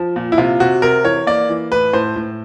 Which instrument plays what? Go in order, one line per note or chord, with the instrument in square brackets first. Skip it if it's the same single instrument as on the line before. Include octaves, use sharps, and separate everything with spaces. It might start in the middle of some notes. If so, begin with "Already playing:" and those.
Already playing: [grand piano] F3
A#2
E4
C3 F4
C3 F#4
C3 A#4
E3 C#5
A#3 D5
E3
A2 B4
A2 C5
A2